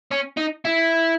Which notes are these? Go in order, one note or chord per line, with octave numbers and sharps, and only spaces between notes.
C#4
D#4
E4